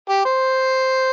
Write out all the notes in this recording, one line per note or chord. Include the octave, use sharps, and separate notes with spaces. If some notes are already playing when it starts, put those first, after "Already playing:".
G4
C5